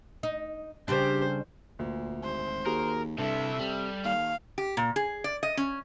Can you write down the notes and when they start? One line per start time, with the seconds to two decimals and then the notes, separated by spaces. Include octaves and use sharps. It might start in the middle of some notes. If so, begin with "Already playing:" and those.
0.23 D#4
0.88 C#3 G3 D4 G4 C5
1.79 D2 A#2
2.24 G#1 C5
2.66 D#2 F#4 G#4 A#4
3.18 G2 C3 E4 A4 E5
3.60 C3 G3
4.04 D#2 F5
4.58 G4
4.77 A#2
4.96 G#4
5.24 D5
5.43 D#5
5.57 C#4